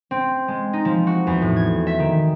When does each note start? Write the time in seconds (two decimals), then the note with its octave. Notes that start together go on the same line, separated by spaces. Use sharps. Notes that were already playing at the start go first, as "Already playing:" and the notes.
0.11 C4
0.48 G#3
0.73 D#4
0.85 F3
1.07 F#4
1.27 E2
1.42 A2
1.56 G#6
1.87 E5
1.99 D#3